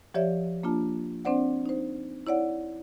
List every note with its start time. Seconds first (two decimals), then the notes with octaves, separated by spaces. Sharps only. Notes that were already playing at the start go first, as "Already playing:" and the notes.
0.14 F3 G4 C#5 D5 E5
0.63 A#3 D4 F4 A5
1.25 C4 D4 C5 D5 F#5
1.66 D#4 C5
2.27 E4 C#5 D5 F#5